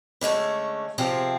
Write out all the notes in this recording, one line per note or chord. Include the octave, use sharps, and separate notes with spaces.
D3 G#3 A3 C#4
C3 F3 C4 G#4